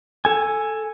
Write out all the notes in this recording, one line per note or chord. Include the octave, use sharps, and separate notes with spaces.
A4 G#5